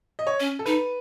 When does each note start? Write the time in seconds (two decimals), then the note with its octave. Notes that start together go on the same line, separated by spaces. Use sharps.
0.19 D#5
0.27 C#5
0.40 C#4
0.59 A4
0.66 D#4 B4